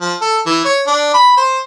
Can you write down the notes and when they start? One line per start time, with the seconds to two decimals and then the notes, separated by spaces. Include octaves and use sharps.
0.01 F3
0.21 A4
0.46 E3
0.65 C#5
0.87 D4
1.14 B5
1.37 C5